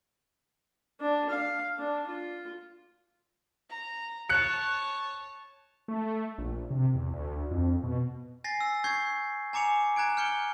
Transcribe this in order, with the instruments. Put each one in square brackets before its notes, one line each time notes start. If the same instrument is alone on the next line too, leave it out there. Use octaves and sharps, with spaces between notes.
[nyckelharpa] D4
F5
D4
F4
[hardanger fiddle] A#5
[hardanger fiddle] C#5 A5 [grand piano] F#6 C#7
[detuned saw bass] A3
A#1
C3
E2
D2
F2
B2
[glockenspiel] G#5 A6 A#6 C7
E6
C#6 G6 G#6 C7
G#5 A#5 D6 C#7 F7
A#5 F#6 G#6 D7
F6 G6 C#7 D7 G7